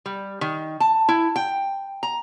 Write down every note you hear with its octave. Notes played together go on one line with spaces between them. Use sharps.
G3
D#3
A5
E4
G5
A#5